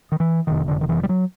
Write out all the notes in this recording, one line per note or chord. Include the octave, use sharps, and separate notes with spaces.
D#3
E3
F#1 F2 C3 D#3
D3
D#3
E3
G3
F#3